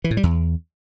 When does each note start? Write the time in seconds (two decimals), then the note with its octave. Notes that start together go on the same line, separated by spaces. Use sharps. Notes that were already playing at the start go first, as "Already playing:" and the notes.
0.04 E3
0.11 A2
0.17 G3
0.23 E2